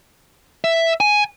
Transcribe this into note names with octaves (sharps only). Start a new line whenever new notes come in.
E5
G#5